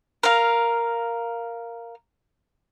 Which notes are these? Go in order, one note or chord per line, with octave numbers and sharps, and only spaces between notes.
A#4 F5